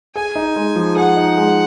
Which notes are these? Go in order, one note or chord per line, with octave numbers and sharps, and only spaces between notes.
G#4 G#5
D#4
G#3
F3
G#4 F#5
D#4
G#3